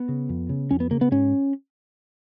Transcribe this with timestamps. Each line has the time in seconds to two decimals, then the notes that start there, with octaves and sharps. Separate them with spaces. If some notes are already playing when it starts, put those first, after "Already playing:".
Already playing: B3
0.09 C#3
0.29 F2
0.49 C#3
0.71 F2 C#4
0.80 B3
0.90 C#3 A#3
1.01 B3
1.11 G#2 C#4